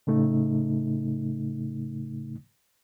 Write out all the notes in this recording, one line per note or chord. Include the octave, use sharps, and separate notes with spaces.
A2 C#3 A3 D#4